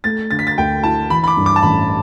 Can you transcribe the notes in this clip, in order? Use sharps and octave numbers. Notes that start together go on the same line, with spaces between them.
A3 A6
D3 A6
B6
A6
D2 G5
E4 A5
E3 B5
B5
D6
G2
D6
A5
A1 B5